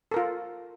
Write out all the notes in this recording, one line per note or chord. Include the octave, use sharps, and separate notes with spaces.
F4 A4 A#4